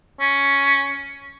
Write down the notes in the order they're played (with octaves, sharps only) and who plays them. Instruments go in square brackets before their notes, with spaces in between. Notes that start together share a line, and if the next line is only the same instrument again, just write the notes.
[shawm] C#4